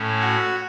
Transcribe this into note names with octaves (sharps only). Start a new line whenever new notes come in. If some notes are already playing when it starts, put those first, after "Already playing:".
Already playing: A2 A3 C#4
F#4 F#5